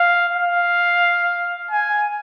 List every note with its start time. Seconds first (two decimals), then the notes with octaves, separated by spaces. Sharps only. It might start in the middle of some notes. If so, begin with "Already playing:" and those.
Already playing: F5
0.36 F5
1.71 G#5